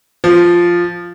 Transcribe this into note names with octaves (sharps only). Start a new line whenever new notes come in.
F3